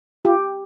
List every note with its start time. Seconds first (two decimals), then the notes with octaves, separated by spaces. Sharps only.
0.25 F4 G4